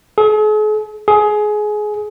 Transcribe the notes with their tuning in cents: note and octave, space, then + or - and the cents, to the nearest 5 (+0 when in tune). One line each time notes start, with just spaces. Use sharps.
G#4 +45
G#4 +20